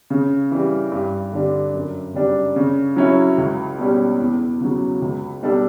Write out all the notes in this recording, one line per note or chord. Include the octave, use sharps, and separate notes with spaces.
C#3
E3 G3
G2
D3 G3 D4
F#2
C#3 G3 D4
C#3
F#3 C#4 E4
C#2
B2 G3 C#4
E2
C#3 F#3
C#2
B2 G3 D4 A4